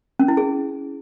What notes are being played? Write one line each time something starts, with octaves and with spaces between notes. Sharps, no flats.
C#4
E4
G#4